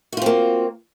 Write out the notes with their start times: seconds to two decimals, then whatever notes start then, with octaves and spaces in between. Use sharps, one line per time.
0.13 F#4
0.17 F4
0.22 C4
0.26 A#3